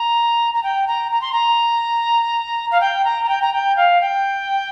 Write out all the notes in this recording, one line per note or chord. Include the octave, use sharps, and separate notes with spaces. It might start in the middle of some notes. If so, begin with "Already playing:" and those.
Already playing: A#5
A#5
G5
A#5
A#5
C6
A#5
F5
G5
A#5
A#5
G5
A#5
G5
F5
G5